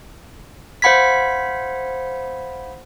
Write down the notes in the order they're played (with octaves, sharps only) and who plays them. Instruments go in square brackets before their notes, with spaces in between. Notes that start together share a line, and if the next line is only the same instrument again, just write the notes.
[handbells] C5 F5 F#5 B5 G#6 B6